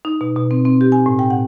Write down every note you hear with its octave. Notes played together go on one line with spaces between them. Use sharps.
D#4
B2
B2
C4
C4
G4
G#5
A2
G5
F#5